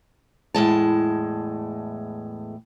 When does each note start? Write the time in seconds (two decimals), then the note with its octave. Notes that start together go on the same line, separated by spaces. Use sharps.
0.55 E2 A2 G#3 A5